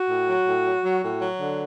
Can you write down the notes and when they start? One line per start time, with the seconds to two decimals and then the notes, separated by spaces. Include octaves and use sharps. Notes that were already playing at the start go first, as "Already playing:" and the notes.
Already playing: F#4
0.10 A2
0.28 F#3
0.46 A2
0.65 F#3
0.84 F#3
1.04 A2
1.21 F#3
1.40 D3